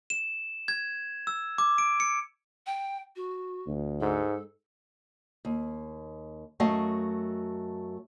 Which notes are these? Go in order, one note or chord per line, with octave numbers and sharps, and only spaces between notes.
E7
G#6
E6
D6
D7
C#7
G5
F#4
D2
G#2 A4
D#2
F#2 A3 F#4 D#5 F5